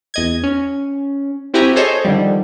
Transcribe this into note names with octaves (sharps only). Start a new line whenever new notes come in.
E2 D#5 G#6
C#4
C4 E4 F#4 G4 G#5 A#5
G#4 A4 C5 C#5 D#5
D3 D#3 F3 G3